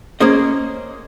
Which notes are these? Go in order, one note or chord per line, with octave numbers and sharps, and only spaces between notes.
A#3 C#4 G#4 C5 D#5